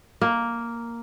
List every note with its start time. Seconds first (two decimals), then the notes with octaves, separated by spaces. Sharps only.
0.21 A#3